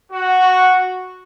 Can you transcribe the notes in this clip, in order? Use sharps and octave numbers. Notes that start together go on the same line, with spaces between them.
F#4